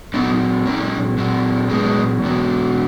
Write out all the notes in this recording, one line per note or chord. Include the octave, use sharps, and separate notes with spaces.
A#2 F#3 B3 D#4
A#3 C#4
A#2 F#3
G#3 B3
E2 B2 F#3